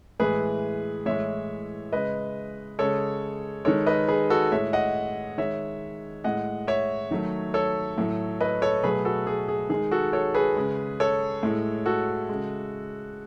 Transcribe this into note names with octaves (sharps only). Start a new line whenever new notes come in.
A2 E3 G#3 G#4 B4
A2 E3 G#3 C#5 E5
C#3 G#3 B4 D#5
C#3 G#3 A4 C#5
D#3 G#3 A4 C#5
B4 D#5
G#4 B4
F#4 A4
A2 G#3 C#5 E5
D#5 F#5
D#3 G#3 C#5 E5
A2 G#3 D#5 F#5
C#5 E5
D#3 F#3 A3
A4 C#5
A2 F#3 A3
B4 D#5
A4 C#5
B2 F#3 A3 G#4 B4
F#4 A4
G#4
G#4
D#3 G#3 G#4
F#4 A4
A4 C#5
G#4 B4
C#3 G#3
A4 C#5
A2 G#3
F#4 A4
C#3 G#3